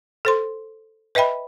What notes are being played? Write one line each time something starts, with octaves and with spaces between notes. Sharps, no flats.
A4 C5 C6
B4 D#5 E5 G5 B5